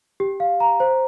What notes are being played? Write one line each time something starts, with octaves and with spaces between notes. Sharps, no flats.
G4
F5
A#5
C5